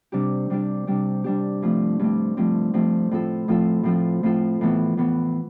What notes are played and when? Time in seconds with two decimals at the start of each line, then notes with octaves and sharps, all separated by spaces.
0.12 C3 G3 D4 G4
0.50 C3 G3 D4 G4
0.87 C3 G3 D4 G4
1.24 C3 G3 D4 G4
1.62 G2 F3 A3 C4
1.99 G2 F3 A3 C4
2.37 G2 F3 A3 C4
2.74 G2 F3 A3 C4
3.11 A2 F3 C4 F4 A4
3.48 A2 F3 C4 F4 A4
3.83 A2 F3 C4 F4 A4
4.23 A2 F3 C4 F4 A4
4.61 A2 E3 B3
4.97 A2 E3 B3